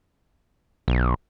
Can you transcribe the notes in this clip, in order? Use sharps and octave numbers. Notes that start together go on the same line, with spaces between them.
B1